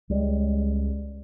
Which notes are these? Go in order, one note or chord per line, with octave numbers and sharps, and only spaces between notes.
C#2 G3 G#3